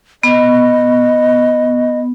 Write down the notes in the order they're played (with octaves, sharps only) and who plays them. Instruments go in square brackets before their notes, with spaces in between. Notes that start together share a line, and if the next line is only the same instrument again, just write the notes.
[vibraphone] B3 [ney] D#5